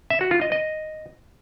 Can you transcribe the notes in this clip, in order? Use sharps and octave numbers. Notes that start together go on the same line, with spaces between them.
E5
F#4
F4
D#5
D#5